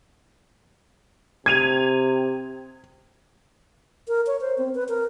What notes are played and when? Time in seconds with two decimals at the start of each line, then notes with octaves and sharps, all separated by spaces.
1.46 C3 G#6 D#7 F7
4.08 A#4
4.27 C#5
4.41 C5
4.58 C4
4.75 B4
4.88 A#4